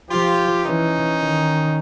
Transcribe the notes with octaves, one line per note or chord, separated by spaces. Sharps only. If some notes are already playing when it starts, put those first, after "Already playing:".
F3 F4 G4
E3 C#4 D#4
D#3